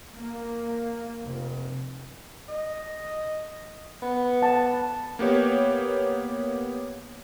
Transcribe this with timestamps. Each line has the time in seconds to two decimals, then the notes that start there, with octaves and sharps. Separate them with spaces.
0.15 A#3
1.22 F1
2.49 D#5
4.02 B3
4.42 F#5 A5
5.19 A#3 B3 G4 C#5